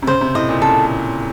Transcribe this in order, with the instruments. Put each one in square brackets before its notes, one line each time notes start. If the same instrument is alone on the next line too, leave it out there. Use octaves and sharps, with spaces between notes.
[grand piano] C3
[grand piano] C#3 [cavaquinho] C5
[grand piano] C3
[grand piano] A2 [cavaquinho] D#5
[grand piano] A#2
[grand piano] C#3 [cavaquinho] A4